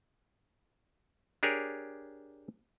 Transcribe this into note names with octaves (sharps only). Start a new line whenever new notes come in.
D4 G4 G#4 A#4 C#5